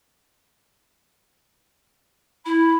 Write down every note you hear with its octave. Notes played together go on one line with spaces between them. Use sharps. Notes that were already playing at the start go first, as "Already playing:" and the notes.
E4 B5